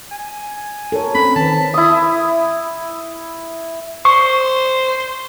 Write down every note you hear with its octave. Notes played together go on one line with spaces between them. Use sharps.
G#5
A4 A#4 C#5
C4 C#4 B5
D#3 B4 A5
E4 D#6
C5 C#6